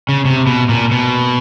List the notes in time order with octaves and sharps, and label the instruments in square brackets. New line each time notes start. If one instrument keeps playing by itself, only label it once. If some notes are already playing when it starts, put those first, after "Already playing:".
[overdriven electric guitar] C#3
C3
B2
A#2
B2